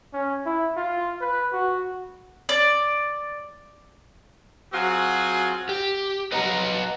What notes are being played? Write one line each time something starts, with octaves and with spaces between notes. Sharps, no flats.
C#4
E4
F4
B4
F#4
D5
F#3 C4 F4 F#4 G#4
G4
B4 D#5 F#5 A#5